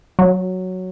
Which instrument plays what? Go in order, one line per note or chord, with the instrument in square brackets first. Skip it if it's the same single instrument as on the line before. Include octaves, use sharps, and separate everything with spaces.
[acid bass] F#3